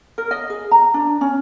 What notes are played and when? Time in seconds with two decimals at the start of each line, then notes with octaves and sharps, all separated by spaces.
0.18 A#4
0.31 D#5
0.50 G#4
0.71 A#5
0.94 D4
1.21 C#4